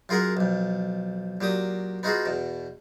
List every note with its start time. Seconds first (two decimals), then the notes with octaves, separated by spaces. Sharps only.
0.09 F#2 F4 G#4 A#4 F#5
0.37 B1 F2
1.41 A#2 F#3 G4 D#6
2.03 B3 D#4 F4 F#4 G#4
2.26 E2 B2